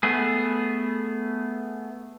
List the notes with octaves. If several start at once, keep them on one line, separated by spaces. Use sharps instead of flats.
A3 B3 G#4